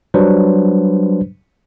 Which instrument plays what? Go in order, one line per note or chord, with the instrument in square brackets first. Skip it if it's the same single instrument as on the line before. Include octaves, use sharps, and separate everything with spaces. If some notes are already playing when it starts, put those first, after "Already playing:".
[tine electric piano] F#3 G3 D4 B4 C5